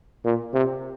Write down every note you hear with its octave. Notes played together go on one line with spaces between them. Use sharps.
A#2
C3